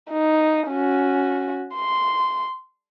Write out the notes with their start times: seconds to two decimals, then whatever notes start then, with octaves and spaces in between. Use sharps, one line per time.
0.11 D#4
0.69 C#4 F#4
1.75 C6